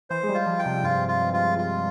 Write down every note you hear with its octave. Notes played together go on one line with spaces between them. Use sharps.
E3 C5
G#3
G3
F4
F3
G5
C3
G2 F4
F4
F4
F4